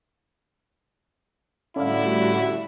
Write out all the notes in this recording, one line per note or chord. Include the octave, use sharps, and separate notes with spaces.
A2 D3 G3 C#4 E4 F#4 D5 F5